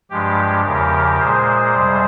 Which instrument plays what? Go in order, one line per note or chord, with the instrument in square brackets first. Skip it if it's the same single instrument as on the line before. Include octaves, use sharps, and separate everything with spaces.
[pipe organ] G2 F3 G#3 G4
E2 C#3 F3 G4 A#4
A#2 G#3 G#4 C5
F2 C3 G3